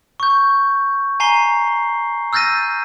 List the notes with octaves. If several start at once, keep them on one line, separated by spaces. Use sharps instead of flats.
C#6 G6
G#5 A#5 C7 G7
E6 F6 G6 A6 A#6 D#7